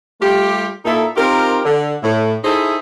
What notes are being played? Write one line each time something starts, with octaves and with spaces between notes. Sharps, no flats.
G3 A3 F4 G4
A#2 A#3 D#4 E4 A4
C4 D#4 F4 G4 A#4
D3
A2
D#4 E4 G#4 A4 C5 E5